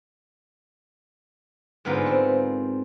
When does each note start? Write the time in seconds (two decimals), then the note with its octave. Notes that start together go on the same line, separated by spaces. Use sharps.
1.85 G#2 D3 B3 F4 A#4 A#5
2.06 C4